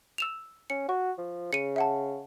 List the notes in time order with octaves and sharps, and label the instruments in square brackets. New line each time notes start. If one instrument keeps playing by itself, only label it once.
[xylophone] E6 E7 F7
[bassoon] C#4 [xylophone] C#7
[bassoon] F#4 [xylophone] C#6
[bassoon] F3
[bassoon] C#3 [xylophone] C#7 D#7
[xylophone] E5 F#5 A5